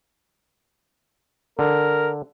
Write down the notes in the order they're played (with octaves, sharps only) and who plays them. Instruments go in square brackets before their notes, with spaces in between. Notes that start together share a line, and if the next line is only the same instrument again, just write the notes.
[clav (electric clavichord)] D3 [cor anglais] A#4